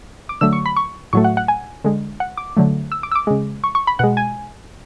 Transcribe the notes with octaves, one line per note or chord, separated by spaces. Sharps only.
D6
D3 F#3 A3 E6
C#6
B5
C#6
A2 F#3 A3 C#6
F#5
F#5
G#5
D3 G#3
F#5
D6
D3 F#3 A3
E6
D6
E6
D6
C#3 G#3
C#6
C#6
B5
B2 G#3 F#5
G#5